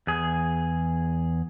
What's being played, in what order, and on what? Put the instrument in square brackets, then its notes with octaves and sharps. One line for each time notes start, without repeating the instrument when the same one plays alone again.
[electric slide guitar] E2 G#4